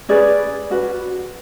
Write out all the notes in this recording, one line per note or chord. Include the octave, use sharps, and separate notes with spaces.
C#4 G#4 B4 D5
C#4 F#4 B4